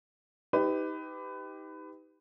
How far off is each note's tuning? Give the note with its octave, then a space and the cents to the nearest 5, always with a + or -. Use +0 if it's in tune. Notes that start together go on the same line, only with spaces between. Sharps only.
D#4 +25 G4 +0 B4 +25